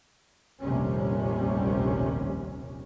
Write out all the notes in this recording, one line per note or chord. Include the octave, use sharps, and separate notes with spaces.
F1 A#1 D#2 C3 G3 C#4